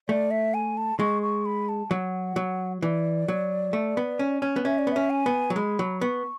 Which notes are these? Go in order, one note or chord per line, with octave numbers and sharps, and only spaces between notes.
A3 D5
E5
G#5
A5
G#3 C#6
C#6
B5
A5
F#3 F#5
F#3
E3 D5
F#3
A3
B3
C#4
C#4
B3
C#4 E5
D5
B3
C#4 E5
G#5
B3
F#3
G#3 B5
F#3
B3 C#6